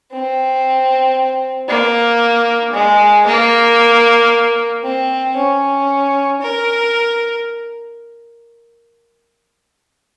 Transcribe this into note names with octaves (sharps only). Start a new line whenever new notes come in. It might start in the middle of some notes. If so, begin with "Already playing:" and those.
C4
A#3
G#3
A#3
C4
C#4
A#4